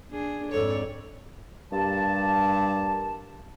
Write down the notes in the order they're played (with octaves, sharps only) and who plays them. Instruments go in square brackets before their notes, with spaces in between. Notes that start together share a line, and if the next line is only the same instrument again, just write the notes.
[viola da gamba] D4 G#4
[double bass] F2 G#2 [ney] A4 [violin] C#5 [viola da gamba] D5
[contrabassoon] G2 [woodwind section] A#3 G4 A5